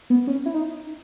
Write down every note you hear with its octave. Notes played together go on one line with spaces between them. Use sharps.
B3
C#4
E4
D#4